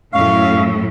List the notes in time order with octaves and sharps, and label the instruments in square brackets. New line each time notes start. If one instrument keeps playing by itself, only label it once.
[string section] F#2 A2 [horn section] C#4 F5 [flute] C#6